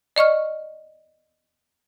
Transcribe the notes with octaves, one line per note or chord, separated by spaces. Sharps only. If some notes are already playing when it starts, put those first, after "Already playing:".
D5 D#5 C#6 F6